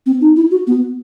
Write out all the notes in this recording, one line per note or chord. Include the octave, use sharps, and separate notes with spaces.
C4
D#4
E4
F#4
B3